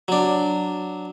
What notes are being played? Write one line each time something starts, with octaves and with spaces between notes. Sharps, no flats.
F#3 D4